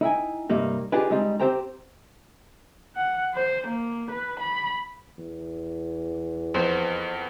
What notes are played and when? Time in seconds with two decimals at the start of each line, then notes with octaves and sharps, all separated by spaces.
0.01 D#4 E4 G5 G#5
0.50 G2 C3 G3 A#3 D#4
0.92 D4 D#4 F4 G4 G#4 B4
1.10 G3 G#3 C4 D#4
1.40 C4 G4 C5 G5 A#5
2.96 F#5
3.35 C5
3.67 A#3
4.11 B4
4.40 B5
5.18 E2
6.54 F2 B3 C5